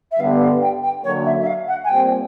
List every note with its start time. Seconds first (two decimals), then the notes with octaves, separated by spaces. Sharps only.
0.11 E5
0.19 G2 D3 G3 B3 F5
0.40 F5
0.61 G5
0.82 G5
1.04 F#2 D3 F#3 A#3 C#5
1.25 E5
1.41 E5
1.46 F5
1.67 F#5
1.84 G#5
1.88 A#2 G3 C4 G5